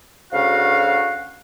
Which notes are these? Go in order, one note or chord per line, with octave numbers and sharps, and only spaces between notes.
D2 C#3 F#4 F5